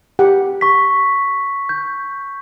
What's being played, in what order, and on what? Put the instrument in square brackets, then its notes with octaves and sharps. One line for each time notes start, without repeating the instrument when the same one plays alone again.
[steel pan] G4 F#5
[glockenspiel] C#6 B6
G6